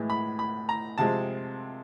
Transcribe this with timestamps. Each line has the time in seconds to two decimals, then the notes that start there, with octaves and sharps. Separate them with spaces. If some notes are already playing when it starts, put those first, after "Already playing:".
Already playing: A2 E3 G#3
0.10 B5
0.39 B5
0.69 A#5
0.98 C3 F3 G#3 C4 A5